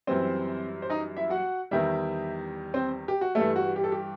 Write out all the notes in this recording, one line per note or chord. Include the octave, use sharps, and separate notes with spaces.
F#2 E3 G3 C4 C5
C5
D#4 D#5
E4 E5
F#4 F#5
E2 D#3 G3 E4 E5
C4 C5
G4
F#4
G2 E3 G3 A3 A4
F#4
G4
A4
G4